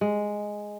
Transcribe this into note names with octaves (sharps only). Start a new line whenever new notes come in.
G#3